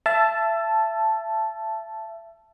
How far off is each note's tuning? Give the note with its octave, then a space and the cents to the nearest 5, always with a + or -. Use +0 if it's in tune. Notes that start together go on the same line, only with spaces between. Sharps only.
E5 +25 A5 -5